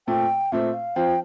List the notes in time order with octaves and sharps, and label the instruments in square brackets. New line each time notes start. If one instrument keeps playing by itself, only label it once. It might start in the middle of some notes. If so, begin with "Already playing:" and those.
[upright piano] A#2 A3 C4 [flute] G5
[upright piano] A#2 A3 C4 [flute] E5
[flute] F5
[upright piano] F3 C4 F4 C5 [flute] G5